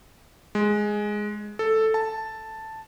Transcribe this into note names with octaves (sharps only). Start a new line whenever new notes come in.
G#3
A4
A5